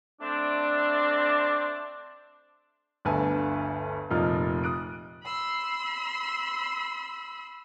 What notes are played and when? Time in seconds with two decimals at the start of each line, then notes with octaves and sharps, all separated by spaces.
0.21 A3 C4 D4
3.05 G1 D2 D3 B4 G#5 A5
4.10 F1 A#2 F3 D#4 F6
4.64 D#6 F#6 D7
5.23 B5 C6 E6